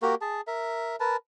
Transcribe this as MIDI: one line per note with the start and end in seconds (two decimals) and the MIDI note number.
0.02 0.15 58
0.02 0.15 66
0.02 0.15 67
0.02 0.15 70
0.21 0.41 68
0.21 0.41 81
0.47 0.96 70
0.47 0.96 76
1.00 1.17 70
1.00 1.17 71
1.00 1.17 81